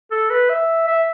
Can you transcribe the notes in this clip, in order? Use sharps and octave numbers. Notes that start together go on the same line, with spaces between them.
A4
B4
E5
E5